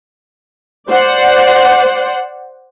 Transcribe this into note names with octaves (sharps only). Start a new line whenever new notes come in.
C5 D5 F#5